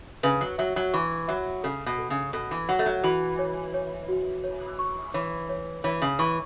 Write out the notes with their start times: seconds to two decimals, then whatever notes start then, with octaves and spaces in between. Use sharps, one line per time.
0.23 C#3 B4
0.41 F#3
0.58 F#3 E5
0.76 F#3
0.93 E3 C#6
1.28 F#3 E5
1.63 C#3 A4
1.86 B2
1.98 A4
2.10 C#3
2.33 B2 A4
2.51 E3
2.69 F#3 F#5
2.79 A3
2.86 F#3
3.03 E3 F#4
3.39 C#5
3.74 C#5
4.09 F#4
4.44 C#5
4.79 C#6
5.14 E3 C#5
5.49 C#5
5.84 E3 C#5
6.02 C#3
6.19 E3 C#6